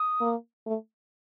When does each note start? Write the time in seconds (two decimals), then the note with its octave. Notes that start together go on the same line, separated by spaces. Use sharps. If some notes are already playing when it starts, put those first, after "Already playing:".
Already playing: D#6
0.21 A#3
0.66 A3